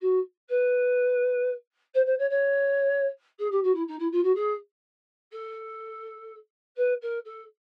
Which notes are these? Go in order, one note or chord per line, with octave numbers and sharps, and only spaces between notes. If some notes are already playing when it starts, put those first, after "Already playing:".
F#4
B4
C5
C5
C#5
C#5
G#4
G4
F#4
E4
D#4
E4
F4
F#4
G#4
A4
B4
A#4
A4